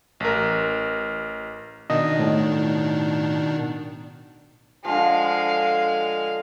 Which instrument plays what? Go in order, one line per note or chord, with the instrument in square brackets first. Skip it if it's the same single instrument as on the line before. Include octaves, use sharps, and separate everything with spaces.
[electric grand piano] A1 A#4
[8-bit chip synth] B2 D#3 D4 [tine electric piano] D#5
[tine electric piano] A2
[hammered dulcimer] D3 F3 [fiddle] G#3 F5